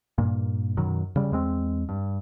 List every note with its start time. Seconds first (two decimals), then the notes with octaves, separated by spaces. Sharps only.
0.18 G2 A#2 A#3
0.77 F#2 B2 D#3 F#3
1.16 C#3 G3
1.32 E2 G#3 C4
1.89 G2